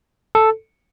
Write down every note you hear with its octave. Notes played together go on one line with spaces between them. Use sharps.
A4